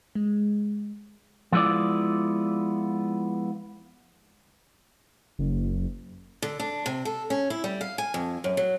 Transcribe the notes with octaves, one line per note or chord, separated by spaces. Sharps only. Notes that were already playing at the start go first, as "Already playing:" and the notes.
G#3
F3 G#3 B3 E4 F4 D5
F#1
D3
D4
C3
A4
C#4
E4
G3
F5
G#5
F2
F#2
F#3